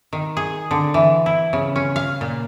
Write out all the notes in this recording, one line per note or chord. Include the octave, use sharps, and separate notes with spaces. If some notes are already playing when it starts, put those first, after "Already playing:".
D#3
G#4
D3
E3
E4
C#3
C#4
F5
A#2